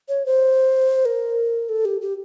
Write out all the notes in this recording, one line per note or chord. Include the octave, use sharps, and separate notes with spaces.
C#5
C5
A#4
A4
G4
G4